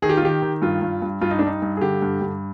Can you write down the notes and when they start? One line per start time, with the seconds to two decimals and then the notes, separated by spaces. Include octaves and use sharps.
0.02 D#3 G#4
0.09 G4
0.17 F4
0.22 D#3 G4
0.42 D#3
0.62 G2 F4
0.82 G2
1.02 G2
1.21 G2 F4
1.31 D#4
1.39 D4
1.42 G2 D#4
1.62 G2
1.77 G#4
1.81 D3 G4
2.02 G2
2.21 G2